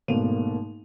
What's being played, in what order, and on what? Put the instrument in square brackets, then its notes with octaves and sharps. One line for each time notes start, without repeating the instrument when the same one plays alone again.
[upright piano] G#1 B2 A3 A#3 D#7 F7